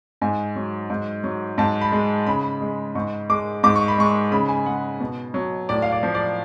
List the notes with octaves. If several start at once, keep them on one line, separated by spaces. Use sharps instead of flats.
G#2 G#5
F#3
G#2
F#3
G#2 A5
B5
G#3
C#3 B5
G#3
G#2 C#6
G#3 D6
G#2 D6
C#6
B5
G#3 C#6
C#3 B5
G#5
G#3 F#5
B2
F#3
A2 D5
F5
D5
F3
D5